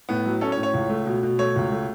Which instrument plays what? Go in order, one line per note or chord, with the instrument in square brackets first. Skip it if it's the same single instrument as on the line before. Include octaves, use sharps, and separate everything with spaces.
[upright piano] A2 [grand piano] B3
[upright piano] F#3
[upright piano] C#4 [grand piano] A4
[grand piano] C#5
[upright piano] A2
[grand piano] C#5
[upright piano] C#2
A3
B2
B2
[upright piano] A3 [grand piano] C#5
[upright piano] C#2
A3